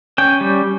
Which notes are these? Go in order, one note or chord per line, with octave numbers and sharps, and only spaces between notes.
C#4 G5
G3